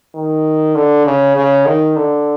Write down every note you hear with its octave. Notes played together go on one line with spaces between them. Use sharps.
D#3
D3
C#3
C#3
D#3
D3